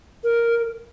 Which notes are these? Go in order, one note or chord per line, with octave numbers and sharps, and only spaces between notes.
A#4